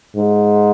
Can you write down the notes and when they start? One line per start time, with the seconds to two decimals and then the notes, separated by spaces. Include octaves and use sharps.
0.16 G#2